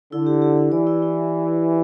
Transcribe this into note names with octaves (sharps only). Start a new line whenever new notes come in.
D3 E4
G4
G4
G4
E3 D5
E4
E4